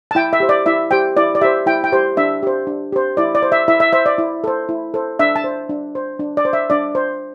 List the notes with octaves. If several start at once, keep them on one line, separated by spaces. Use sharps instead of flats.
A5
E4 G5
E5
G4 C5
D5
E4 E5
G4 C5 G5
E4 D5
D5
G4 C5 E5
E4 G5
G5
G4 C5
D4 E5
G4 C5
D4
G4 C5
E4 D5
D5
C5
E5
E4 E5
E5
C5 E5
D5
E4
A4 C5
E4
A4 C5
D4 E5
A5
C5
D4
C5
D4
D5
C5
E5
D4 D5
C5